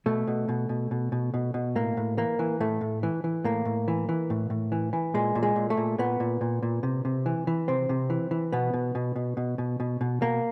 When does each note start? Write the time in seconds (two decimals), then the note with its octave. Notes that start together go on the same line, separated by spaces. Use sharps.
0.06 B2 A3
0.27 B2
0.49 B2
0.69 B2
0.91 B2
1.12 B2
1.34 B2
1.54 B2
1.75 A2 A#3
1.97 A2
2.17 E3 A#3
2.39 E3
2.60 A2 A3
2.81 A2
3.03 E3
3.24 E3
3.45 A2 A#3
3.65 A2
3.88 E3
4.09 E3
4.30 A2
4.50 A2
4.72 E3
4.93 E3
5.14 A#2 G#3
5.35 A#2
5.43 G#3
5.56 A#2
5.70 A3
5.77 A#2
5.98 A#2 B3
6.20 A#2
6.41 A#2
6.63 A#2
6.83 C3
7.05 C3
7.26 E3
7.47 E3
7.68 C3 C4
7.89 C3
8.10 E3
8.31 E3
8.52 B2 B3
8.74 B2
8.95 B2
9.16 B2
9.37 B2
9.58 B2
9.80 B2
10.01 B2
10.22 B2 A#3